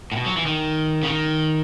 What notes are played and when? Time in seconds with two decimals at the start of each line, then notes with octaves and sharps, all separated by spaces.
0.12 A2
0.16 B2
0.26 F#3
0.37 E3
0.46 D#3
1.03 C#3
1.07 D#3